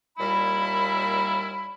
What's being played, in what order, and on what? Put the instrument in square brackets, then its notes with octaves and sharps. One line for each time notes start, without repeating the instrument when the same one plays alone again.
[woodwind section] D#2 A#2 G3 E4 B5